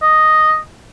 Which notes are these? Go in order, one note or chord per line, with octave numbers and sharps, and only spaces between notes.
D#5